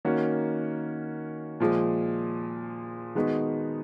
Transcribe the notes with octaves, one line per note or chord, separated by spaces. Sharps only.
D#3 A#3 C#4 F#4
A#2 F3 G#3
D#3 G#3 B3 D#4 F#4